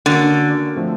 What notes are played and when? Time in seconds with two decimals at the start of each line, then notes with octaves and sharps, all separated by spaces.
0.06 D3 A#3 C#4 F#4 A#4
0.76 D3 F3 A3 C4